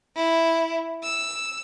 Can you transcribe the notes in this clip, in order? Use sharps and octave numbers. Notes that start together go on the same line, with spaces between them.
E4
E6